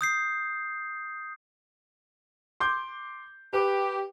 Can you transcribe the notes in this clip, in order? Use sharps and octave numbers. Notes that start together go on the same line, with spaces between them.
D#6 G6 C7
C6 D6 G6
G4 B4